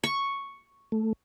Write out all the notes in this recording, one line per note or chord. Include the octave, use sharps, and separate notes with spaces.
C#6
A3